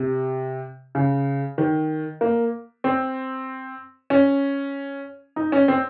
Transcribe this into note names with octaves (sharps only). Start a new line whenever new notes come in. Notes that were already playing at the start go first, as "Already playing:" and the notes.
Already playing: C3
C#3
D#3
A#3
C4
C#4
D#4
C#4
C4